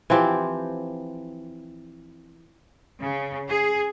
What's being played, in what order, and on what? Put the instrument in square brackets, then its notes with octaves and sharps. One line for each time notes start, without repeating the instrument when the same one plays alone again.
[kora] E3 F3 C4 G4
[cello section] C#3
G#4